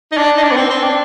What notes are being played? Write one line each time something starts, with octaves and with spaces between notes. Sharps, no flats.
D#4
D4
D#4
D4
B3
C4
C4
D4